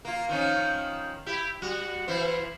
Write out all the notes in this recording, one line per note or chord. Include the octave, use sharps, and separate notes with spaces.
A#3 F4
D#3 F3 C#4
E4 G4
G3 F#4
E3 E4 C5